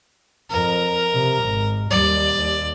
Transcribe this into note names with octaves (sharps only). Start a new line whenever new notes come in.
F2 A#4
C3
G#1
D#2 G3 D5
D#2